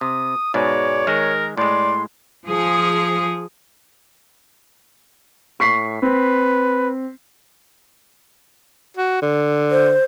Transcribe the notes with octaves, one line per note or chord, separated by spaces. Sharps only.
C3 D#6
G#2 B2 G#3 C#5 D5
D#3 G#3 A#4
A2 G#3 D5 C6
F3 G#4
A2 C#6 B6 C7
C4 B4
F#4
D3
C5